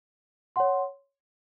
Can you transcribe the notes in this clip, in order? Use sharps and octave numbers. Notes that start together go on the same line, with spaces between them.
C#5 F#5 C6